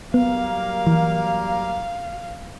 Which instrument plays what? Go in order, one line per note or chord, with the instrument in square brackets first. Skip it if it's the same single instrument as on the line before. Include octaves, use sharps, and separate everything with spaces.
[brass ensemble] F#3 G3 A#3 [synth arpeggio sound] B3 [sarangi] F5
[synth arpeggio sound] E3